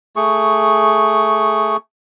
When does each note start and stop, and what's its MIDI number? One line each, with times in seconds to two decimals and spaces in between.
0.16 1.77 57
0.16 1.77 68
0.16 1.77 85